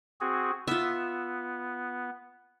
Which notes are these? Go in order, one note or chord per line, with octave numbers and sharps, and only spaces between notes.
C4 F#4 G#4
B3 F4 E5